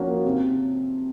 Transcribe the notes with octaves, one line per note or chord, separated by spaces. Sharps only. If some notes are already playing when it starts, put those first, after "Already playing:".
Already playing: F3 A#3 C#4 F#4
C3